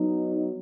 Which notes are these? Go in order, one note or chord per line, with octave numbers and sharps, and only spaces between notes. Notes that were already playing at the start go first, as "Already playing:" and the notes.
Already playing: F#3 B3 D#4